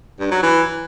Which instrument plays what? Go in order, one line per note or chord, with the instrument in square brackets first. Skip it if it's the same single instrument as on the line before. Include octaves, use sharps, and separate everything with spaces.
[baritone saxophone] G2
F#3
E3